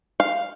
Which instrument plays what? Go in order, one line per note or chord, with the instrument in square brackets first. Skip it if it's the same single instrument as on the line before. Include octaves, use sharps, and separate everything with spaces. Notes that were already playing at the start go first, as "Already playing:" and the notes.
[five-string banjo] F5